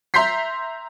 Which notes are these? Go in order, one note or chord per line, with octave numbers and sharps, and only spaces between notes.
E5 A#5 C6 G6 B6 C7